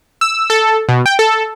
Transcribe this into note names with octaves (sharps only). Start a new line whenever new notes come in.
E6
A4
B2
G5
A4